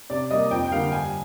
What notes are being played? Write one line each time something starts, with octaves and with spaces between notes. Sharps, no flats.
C3 D5
G3 A#3 D#5
F2 G5
G5
D3 G3 A#3 F5
G2 G#5